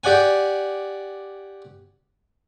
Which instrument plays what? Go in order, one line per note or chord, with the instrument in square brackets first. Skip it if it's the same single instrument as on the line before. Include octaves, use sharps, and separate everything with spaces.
[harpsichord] G4 D5 F#5 G#5